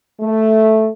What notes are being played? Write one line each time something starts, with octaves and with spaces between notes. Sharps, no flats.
A3